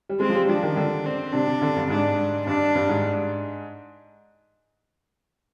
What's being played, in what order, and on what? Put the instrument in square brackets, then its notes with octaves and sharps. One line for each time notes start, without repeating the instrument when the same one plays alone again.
[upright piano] G3
[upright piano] G#3 [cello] C4
[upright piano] F3
G3
[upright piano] F3 [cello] D4
[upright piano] D#3
D3
[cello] C4
[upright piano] C3 [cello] D4
[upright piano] C3
D3
G2
[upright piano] G#2 [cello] D4
[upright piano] G2 [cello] D4
[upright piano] G2
G#2